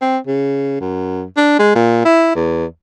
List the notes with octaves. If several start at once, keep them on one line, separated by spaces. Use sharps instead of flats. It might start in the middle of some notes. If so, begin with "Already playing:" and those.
C4
C#3
F#2
D4
G#3
A#2
E4
E2